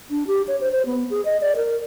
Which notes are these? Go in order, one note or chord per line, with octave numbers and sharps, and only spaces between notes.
D4
G4
C#5
C5
C5
B3
G#4
D#5
D5
A#4